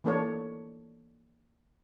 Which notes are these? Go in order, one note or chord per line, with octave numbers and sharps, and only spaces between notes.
E3 A#3 D4 A4 C#5